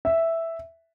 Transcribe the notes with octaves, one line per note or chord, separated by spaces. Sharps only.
E5